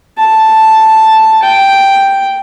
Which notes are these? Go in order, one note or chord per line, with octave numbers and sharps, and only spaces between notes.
A5
G5